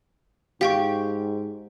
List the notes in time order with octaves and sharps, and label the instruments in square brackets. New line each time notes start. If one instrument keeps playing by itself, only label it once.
[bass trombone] G#2 [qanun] G4 [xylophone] F5 G5 C#6